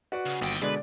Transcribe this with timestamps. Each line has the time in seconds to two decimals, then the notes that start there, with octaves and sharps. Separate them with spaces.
0.12 F#4 B4 D5 F#5
0.26 C#3
0.41 G1 D#2 G5
0.62 B2 D3 G#3 B4 D5